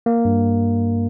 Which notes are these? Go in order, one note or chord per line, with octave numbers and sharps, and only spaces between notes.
A#3
G2